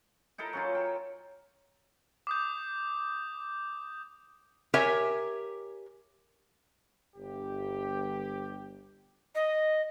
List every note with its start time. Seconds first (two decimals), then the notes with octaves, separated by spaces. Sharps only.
0.38 D#4 E4 A4 A#4
0.53 F#3 C#4 F4
0.75 G5
2.27 D6 D#6 G6
4.74 G4 A#4 C#5 E5 G#5
7.17 G1 G4
9.35 D#5